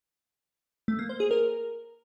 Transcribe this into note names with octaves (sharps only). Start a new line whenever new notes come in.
A3
A#3
C5
G#4
A#4